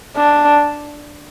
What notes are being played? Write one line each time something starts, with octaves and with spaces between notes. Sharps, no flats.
D4